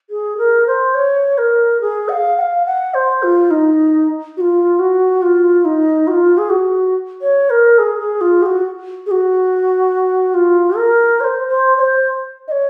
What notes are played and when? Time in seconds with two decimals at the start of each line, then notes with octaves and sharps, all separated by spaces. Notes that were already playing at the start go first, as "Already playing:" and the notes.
0.10 G#4
0.38 A#4
0.67 C5
0.94 C#5
1.38 A#4
1.81 G#4
2.09 F#5
2.13 F5
2.38 F#5
2.41 F5
2.66 F#5
2.94 C5
3.23 F4
3.51 D#4
4.37 F#4
4.41 F4
4.79 F#4
5.22 F4
5.65 D#4
6.07 F#4
6.11 F4
6.38 G#4
6.50 F#4
7.22 C#5
7.50 A#4
7.79 G#4
7.99 G#4
8.21 F4
8.42 G#4
8.46 F#4
9.06 G#4
9.11 F#4
10.34 F4
10.77 A#4
11.20 C#5
11.24 C5
11.48 C5
11.77 C#5
11.81 C5
12.48 D#5
12.51 C#5